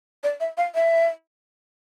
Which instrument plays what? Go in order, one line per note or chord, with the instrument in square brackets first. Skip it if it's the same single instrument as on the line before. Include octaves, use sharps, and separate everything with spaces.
[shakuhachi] D5
E5
F5
E5